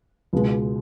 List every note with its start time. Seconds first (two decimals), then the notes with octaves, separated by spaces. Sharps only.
0.33 C#2 B2 G#3